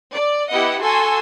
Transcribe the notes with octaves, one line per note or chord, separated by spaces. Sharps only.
D5
B3 E4 G4 D#5 F#5
F#4 A4 G#5 A5 C6 E6